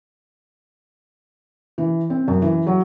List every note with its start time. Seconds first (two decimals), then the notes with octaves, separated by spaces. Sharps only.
1.78 E3
2.10 C4
2.28 F#2
2.42 E3
2.67 F#3